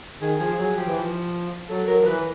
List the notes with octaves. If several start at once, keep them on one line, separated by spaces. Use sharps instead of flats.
D#3 G#4
F3 G#4
F#3 G#4
F3 G4
E3
F3
F#3 A4
F#3 A#4
F3
E3 B4